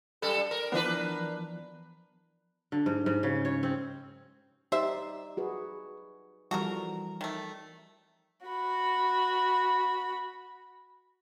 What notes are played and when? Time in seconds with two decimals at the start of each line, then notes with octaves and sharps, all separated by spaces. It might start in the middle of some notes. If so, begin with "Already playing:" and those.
0.22 F#2 G3 A4
0.51 A#4
0.72 E3 F3 B3 D4 A#4 B4
2.72 D3
2.86 G#2
3.06 G#2
3.23 C#3
3.45 C#5
3.63 C4
4.72 D#4 G4 C5 D5 E5
5.37 F#4 G#4 B4
6.51 E3 F3 G3 F#4 A4 A#4
7.21 D#3 A3
8.46 F#4 B5